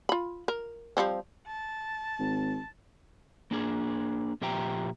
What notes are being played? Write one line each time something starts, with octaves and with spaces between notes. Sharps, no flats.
F4 B5
A#4
F3 G3 C4
A5
G#1
A#3 D4 G#4
A#2 F3 G4 E5 G5 A#5